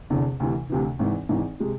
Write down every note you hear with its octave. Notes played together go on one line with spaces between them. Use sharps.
F1 E2 D3
D2 C3 E3
D2 C3 E3
G#1 G#2 E3
G#1 G#2 E3
C3 G#3